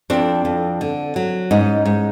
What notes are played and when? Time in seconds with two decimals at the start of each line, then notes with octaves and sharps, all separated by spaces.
0.10 F2 C4 D4
0.45 F2
0.81 D3
1.16 F#3
1.51 G#2 C#4 D#4
1.85 G#2